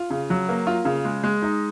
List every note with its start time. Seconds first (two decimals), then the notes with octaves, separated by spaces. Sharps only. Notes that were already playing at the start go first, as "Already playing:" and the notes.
Already playing: F4
0.10 C#3
0.30 F#3
0.49 A#3
0.67 F4
0.85 C#3
1.05 G#3
1.24 G#3
1.42 D#4